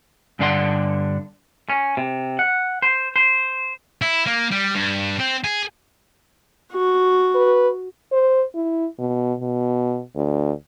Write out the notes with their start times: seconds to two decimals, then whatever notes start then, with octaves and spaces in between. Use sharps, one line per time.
0.39 G2 D3 D4 A4 F#5 C6
1.70 C#4
1.97 C3
2.39 F#5
2.82 C5
3.16 C5
4.02 E4
4.26 A#3
4.51 G3
4.75 G2
5.19 C4
5.44 G#4
6.73 F#4
7.35 B4
8.12 C5
8.55 E4
8.98 B2
9.40 B2
10.15 D2